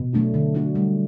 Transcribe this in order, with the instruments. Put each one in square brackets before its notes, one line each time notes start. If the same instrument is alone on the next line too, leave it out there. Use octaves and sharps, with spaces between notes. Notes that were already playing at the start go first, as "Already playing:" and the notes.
Already playing: [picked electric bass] B2
[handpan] F#3 A3 D4 F#4
D3
F#3 A3 D4 F#4
G3